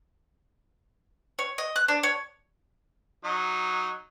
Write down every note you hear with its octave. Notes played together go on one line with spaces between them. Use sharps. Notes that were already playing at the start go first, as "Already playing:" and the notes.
C#5
D#5
F#6
D4
C#5
F#3 D#4